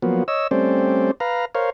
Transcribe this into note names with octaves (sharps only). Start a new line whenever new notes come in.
F3 F#3 A#3 B3
C#5 D#5 E6
G3 A3 C4 C#4 C5 D5
B4 F5 A#5
A#4 C5 C#5 F5